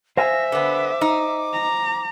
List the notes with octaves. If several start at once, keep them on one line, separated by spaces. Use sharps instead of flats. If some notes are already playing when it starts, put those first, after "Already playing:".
C5 E5 F5 G#5 A#6
D3 B3 D6
D#4
A#5